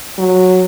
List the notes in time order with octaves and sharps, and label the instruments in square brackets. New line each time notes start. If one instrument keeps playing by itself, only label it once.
[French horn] F#3